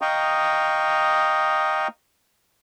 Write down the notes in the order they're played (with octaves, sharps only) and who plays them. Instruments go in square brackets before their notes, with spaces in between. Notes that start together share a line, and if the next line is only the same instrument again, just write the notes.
[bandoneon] D#5 F5 G5 A#5 C#6 D#6